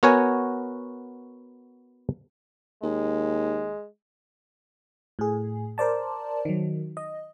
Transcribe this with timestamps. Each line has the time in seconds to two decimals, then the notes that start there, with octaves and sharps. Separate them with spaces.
0.03 B3 F#4 A#4 C#5 F#5 G#5
2.83 D#2 G#3
5.19 A2 G#4
5.78 A#4 C5 D5 A5
6.45 D#3 F#3
6.97 D#5